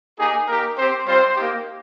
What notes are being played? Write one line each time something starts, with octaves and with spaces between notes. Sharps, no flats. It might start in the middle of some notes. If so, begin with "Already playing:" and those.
A#3 D#4 G4 G#4
A#3 D#4 G4 A#4
C4 G4 C5
G3 C4 F4 C5
A#3 D#4 G4